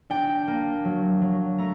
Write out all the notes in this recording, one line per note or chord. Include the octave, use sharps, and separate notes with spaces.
D4 G5
A#3
F#3
F#3
A3 A#5